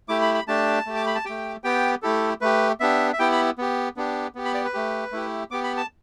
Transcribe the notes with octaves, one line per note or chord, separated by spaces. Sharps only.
A3 E4 G4 D6
B5
B5
A3 D4 G4 A5
A3 G4
D6
B5
A5
A3 G4 G5
B3 G4 G5
A3 E4 G4 A4
A3 G4 B4
B3 D4 G4 E5
E5
B3 E4 G4 G5
B5
B3 G4
B3 D4 G4
B3 G4
B5
D5
B4
A3 G4
A3 E4 G4
B3 G4 D6
B5
A5